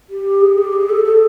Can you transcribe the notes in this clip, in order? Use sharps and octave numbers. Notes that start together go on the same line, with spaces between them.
G4
G#4
G4
G#4
A4
A4